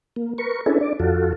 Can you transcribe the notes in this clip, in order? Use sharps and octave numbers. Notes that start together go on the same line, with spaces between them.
A#3
A#4 B4 C#6
C#4 D4 E4 G#4 A4 B4
D4 D5
F2 F4 F#4 A4